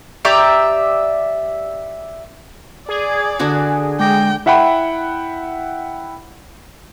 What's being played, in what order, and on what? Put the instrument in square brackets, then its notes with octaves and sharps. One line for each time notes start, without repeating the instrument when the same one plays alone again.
[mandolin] G4 D5 E5 A#5
[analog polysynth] G#4 [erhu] D5
[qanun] D3 D4 F#4
[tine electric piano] G#3 D6 A#6 [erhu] G5
[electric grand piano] E4 E5 F#5 G5 B5